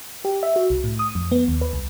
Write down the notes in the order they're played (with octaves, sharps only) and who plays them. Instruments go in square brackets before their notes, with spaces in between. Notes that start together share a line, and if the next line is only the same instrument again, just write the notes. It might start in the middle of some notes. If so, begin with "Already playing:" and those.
[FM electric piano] G4
E5
F#4
C2
A2
D#6
F2
B3
D#2
B4
C2